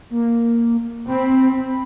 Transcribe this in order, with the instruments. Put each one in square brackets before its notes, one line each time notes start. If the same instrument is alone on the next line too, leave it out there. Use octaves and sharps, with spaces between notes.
[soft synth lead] A#3
[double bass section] C4 [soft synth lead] B5